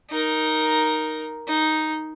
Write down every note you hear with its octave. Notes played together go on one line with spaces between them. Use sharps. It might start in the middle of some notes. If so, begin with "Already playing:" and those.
D#4 A#4
D#4